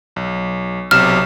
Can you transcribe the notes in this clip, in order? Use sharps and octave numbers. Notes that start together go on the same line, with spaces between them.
B1
B1 C3 F6 E7